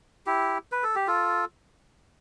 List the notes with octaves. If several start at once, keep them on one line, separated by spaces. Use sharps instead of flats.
E4 G4
B4
A4
G4
F4 A4